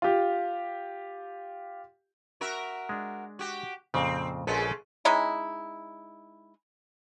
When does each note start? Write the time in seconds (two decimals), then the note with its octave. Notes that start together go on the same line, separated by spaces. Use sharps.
0.02 F4 G4
2.41 F#4 A#4 E5
2.89 G#3 D4
3.39 F#4 G4
3.94 F2 A#2 C#3 C4
4.47 A#1 C#3 G#3 A4 B4 F#5
5.05 G#3 C#4 D#4 E4